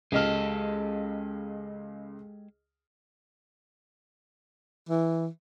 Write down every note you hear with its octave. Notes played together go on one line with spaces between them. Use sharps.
C#2 G#3 G4 A4 D#5 F6
E3